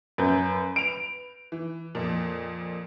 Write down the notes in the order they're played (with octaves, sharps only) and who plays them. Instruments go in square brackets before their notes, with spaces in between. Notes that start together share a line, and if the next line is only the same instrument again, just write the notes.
[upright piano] F#2 [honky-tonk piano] B4 G6
[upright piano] D7 F7
[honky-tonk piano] E3
F2 A#2